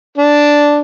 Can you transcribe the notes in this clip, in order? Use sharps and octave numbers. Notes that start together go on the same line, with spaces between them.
D4